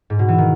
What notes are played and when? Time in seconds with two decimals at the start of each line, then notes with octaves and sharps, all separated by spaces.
0.10 G#2
0.19 B2
0.28 E3
0.38 D#3